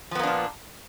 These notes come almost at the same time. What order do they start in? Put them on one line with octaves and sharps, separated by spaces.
F3 B3 A#3 D4 A#2